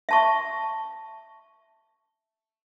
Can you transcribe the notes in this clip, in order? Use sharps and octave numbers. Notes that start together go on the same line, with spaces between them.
E5 A5 C#6